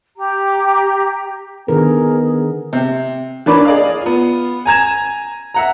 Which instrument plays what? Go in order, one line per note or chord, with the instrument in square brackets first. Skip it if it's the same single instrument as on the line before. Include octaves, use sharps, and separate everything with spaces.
[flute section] G4 A#5
[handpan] D3 D#3 A#4 [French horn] B3 [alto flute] G#4
[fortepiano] C3
[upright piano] E3 A#3 D4 B4 C#5 D5
G#4 D5 D#5 F5
B3 F4
G#5 A#5 G#6 E7
E5 F#5 A#5